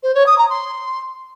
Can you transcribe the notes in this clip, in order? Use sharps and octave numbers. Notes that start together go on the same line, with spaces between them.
C5
C#5
D#6
A#5
C6